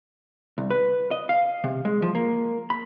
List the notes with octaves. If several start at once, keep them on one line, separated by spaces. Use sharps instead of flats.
C2
B4
D#5
F5
C3
G#3
F3
A#3
B5